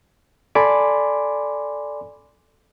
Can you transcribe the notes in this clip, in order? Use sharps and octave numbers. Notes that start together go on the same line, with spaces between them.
A4 D5 G#5 B5 C6 D6